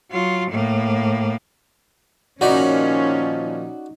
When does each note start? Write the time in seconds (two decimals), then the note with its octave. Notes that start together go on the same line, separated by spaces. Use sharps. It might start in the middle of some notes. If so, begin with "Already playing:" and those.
0.11 F#3 F4
0.51 A2 A#3
2.41 A#2 D#3 F3 C#4 D#4 F#4 D5 B5